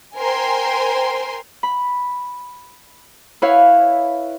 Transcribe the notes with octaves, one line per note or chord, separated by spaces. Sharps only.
A#4 C5 G5 G#5 C6
B5
E4 B4 C#5 F5